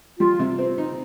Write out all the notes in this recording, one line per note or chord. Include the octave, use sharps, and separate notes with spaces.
G3 F4
C3
C4
D#4